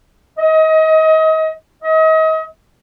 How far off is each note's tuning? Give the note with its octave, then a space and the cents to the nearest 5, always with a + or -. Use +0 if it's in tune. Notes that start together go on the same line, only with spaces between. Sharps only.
D#5 +30
D#5 +35